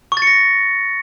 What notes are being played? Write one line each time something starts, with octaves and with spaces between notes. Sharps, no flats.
C#6
A6
C#7
A#6